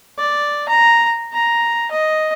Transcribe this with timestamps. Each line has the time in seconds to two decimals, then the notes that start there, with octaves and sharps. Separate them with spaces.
0.18 D5
0.69 A#5
1.32 A#5
1.91 D#5